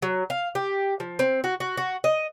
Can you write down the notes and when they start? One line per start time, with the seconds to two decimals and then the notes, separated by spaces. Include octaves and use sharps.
0.02 F#3
0.30 F5
0.55 G4
1.00 F3
1.19 C4
1.44 F#4
1.60 F#4
1.77 F#4
2.04 D#5